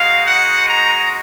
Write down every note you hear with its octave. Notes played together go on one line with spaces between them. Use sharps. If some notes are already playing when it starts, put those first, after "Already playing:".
Already playing: G#3 D#4 F#4 F5
F#5
A#5